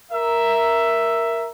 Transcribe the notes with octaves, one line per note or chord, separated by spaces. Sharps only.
A#4 E5